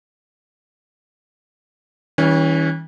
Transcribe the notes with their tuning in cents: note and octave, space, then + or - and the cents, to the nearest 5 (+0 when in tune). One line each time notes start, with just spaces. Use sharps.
E3 -40 G3 +0 C#4 +0